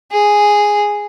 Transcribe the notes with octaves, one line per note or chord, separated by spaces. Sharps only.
G#4